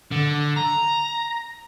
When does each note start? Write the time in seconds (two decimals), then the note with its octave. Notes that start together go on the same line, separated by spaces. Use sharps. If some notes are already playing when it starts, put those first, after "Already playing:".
0.11 D3
0.56 A#5